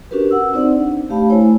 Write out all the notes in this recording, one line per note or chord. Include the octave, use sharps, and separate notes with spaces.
C#4 D4 F#4 G4 A#4 B4
F#5 E6
C4 D#4 C5 D5 F#5
D4
A3 G4 F5 A5 B5
A3 E4 C5 C#5 G#5